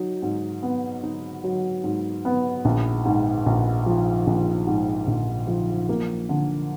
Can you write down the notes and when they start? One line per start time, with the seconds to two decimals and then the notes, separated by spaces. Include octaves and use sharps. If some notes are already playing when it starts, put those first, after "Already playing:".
Already playing: F#3 D#4
0.22 G#2
0.63 B3
1.03 D#4
1.44 F#3
1.84 G#2
2.25 B3
2.65 A#1
3.05 G#2
3.46 A#1
3.86 F3
4.27 A#1
4.67 G#2
5.07 A#1
5.47 F3
5.89 A#3
6.29 D3